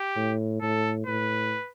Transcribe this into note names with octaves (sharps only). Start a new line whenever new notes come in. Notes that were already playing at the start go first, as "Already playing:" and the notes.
Already playing: G4
A2
A2 A4
A2 B4